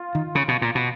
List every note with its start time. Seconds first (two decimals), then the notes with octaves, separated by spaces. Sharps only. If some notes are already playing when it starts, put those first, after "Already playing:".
Already playing: F4
0.15 D#3
0.35 C#3
0.48 B2
0.62 A#2
0.75 B2